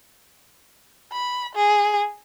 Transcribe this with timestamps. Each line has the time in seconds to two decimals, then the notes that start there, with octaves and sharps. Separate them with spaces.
1.12 B5
1.55 G#4